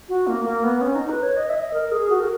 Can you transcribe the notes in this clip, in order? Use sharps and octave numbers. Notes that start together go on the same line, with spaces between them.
F#4
A#3
A#3
B3
C#4
D#4
B4
C#5
D#5
E5
D#5
A#4
G#4
F#4
A#4